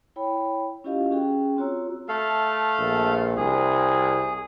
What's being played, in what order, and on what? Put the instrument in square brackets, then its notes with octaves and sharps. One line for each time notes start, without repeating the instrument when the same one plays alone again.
[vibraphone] E4 C#5 G5 B5
C#4 E4 F4 G4 D#5 F5
C#4 F#4 G#4 G5
C4 F4 F#4 C#5 A#5 E6
[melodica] A3 A4 F5
[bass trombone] A#1
[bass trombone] C2 [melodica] G#4